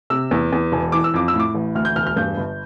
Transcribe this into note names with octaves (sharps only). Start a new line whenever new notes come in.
C3 E6
E2
E2
E1
E3 D6
E6
F2 D6
E6
A2
D6
A1
D2 F6
G6
E1 F6
F6
G2 G6
G1